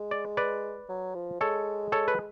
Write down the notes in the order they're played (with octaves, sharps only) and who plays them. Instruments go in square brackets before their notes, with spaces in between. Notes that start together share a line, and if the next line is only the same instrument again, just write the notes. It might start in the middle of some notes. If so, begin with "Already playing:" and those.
Already playing: [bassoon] G#3
[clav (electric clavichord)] D5
B4 D5
[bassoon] F#3
F3
[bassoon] G#3 [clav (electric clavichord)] A4 C#5
[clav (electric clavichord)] A4 C#5
B4